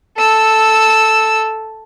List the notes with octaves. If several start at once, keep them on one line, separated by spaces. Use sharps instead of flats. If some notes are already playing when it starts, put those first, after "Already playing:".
A4 E6